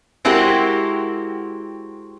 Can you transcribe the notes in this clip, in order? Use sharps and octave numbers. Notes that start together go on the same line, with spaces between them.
G#3 C4 E4 F#4 G4 A#4